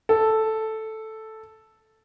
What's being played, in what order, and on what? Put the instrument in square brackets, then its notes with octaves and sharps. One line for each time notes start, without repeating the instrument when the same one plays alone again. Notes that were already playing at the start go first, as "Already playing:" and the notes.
[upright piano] A4